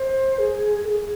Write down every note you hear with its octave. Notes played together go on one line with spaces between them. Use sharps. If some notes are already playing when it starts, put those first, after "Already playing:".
Already playing: C5
G#4
A4
G#4